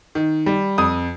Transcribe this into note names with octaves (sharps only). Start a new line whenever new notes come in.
D#3
G3
F2 D#6